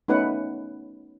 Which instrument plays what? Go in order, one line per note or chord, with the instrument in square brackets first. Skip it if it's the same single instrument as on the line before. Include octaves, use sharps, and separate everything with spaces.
[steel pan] A3 B3 C#4 D#4 B4 F#5